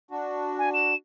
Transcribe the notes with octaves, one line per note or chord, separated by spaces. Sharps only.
D4 F#4
G#5
E7